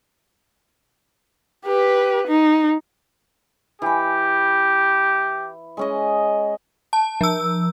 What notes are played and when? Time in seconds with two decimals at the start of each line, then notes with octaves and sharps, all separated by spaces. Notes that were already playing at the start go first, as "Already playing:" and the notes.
1.66 G4 B4
2.27 D#4
3.82 E3 G4 B5
5.77 G#3 C#4 D#5
6.93 A5
7.21 F3 E6